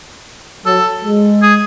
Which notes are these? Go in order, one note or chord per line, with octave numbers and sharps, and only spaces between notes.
F#3 A4
G#3
G#4